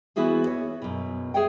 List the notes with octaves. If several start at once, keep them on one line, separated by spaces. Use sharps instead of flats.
E3 B3 E4 F#4 G#4 C5
C#5
F#2 B2
G#4 C5 C#5 E5 F#5 G5